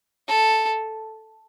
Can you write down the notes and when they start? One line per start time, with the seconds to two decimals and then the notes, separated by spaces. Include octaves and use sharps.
0.28 A4